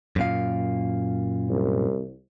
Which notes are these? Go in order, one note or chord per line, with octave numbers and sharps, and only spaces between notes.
F#2 A#2 F5
C2